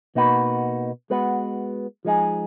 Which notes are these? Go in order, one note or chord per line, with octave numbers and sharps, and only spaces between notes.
B2 A#3 D#4 F#4 B4
G#3 B3 F#4 B4
F3 G#3 D#4 G#4